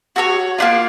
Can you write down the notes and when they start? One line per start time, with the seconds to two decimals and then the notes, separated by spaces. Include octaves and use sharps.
0.16 F#4 A4 C#5
0.58 A#3 D4 F4